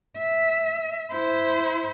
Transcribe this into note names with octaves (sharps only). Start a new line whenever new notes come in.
E5
E4 C5